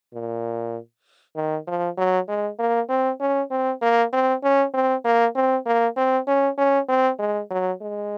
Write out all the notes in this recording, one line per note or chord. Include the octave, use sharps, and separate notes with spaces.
A#2
D#3
F3
F#3
G#3
A#3
C4
C#4
C4
A#3
C4
C#4
C4
A#3
C4
A#3
C4
C#4
C#4
C4
G#3
F#3
G#3